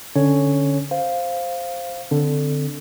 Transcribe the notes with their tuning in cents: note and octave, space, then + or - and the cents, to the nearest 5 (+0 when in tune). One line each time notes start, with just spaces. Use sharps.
D3 -5 C#4 +0 C#5 +0
C5 +0 F5 +0
D3 +0 C4 -15